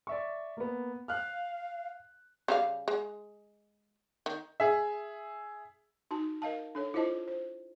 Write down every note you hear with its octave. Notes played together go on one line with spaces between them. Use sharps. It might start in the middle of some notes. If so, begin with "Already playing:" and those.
D5 E5 C#6
A#3 B3
F5 F6 F#6
C#3 G3 F5
G#3
D#3
G#4 E5
D#4 F#4 A5
A#4 D#5 F5 A5
D4 A4 C#5
E4 F4 C5 D#5 A5
C5